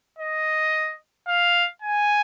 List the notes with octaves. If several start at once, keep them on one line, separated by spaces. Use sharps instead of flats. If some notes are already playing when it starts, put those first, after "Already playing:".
D#5
F5
G#5